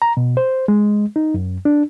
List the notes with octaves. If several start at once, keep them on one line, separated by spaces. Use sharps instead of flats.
A#5
B2
C5
G#3
D#4
F#2
D4